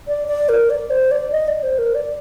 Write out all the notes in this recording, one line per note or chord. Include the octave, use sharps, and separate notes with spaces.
D5
D5
A#4
D5
C5
D5
D#5
D5
C5
A#4
D5